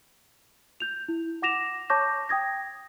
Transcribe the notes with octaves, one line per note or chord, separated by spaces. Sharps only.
G6 F7
E4
F#5 D6 A#6 E7 F7
C#5 A5 C#6 D6 G6 A#6
G5 D#6 G#6 A#6